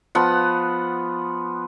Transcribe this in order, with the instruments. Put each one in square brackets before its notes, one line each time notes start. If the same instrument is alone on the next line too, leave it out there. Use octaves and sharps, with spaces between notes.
[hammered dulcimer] F3 B3 F#5